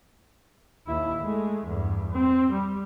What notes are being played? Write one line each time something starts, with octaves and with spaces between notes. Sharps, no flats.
D#2 E4
G#3 A3
E2 G2
C4
G3